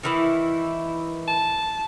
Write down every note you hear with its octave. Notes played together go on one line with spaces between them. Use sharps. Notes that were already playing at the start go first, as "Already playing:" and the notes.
D#3 E3 E4
A5